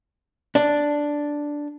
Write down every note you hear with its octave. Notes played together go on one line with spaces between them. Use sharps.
D4